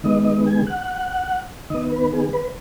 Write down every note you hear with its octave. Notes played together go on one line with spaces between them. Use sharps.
D#3 G#3 B3 D#5
D#5
G#5
F#5
D#3 B3 D#5
B4
G#4
B4